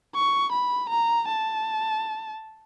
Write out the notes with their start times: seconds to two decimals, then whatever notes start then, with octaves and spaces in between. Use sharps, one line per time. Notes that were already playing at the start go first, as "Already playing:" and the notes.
0.15 C#6
0.53 B5
0.90 A#5
1.28 A5